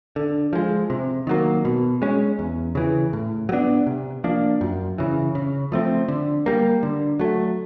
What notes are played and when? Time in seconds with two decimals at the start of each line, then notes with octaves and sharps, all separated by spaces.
0.16 D3
0.53 F3 G#3
0.90 C3
1.27 D#3 F#3 A#3
1.65 B2
2.02 G#3 C#4
2.39 E2
2.75 C#3 E3
3.13 A2
3.49 F#3
3.52 B3 D4
3.87 C3
4.24 F3 A#3 D4
4.61 F#2
4.98 C#3 E3
5.35 C#3
5.72 F3 A3 C4
6.08 D3
6.46 G3 A#3
6.83 D3
7.19 F#3 A3